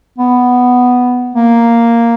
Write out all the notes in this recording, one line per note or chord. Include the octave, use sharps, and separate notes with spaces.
B3
A#3